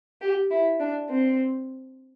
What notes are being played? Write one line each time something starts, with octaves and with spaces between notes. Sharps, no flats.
G4
E4
D4
C4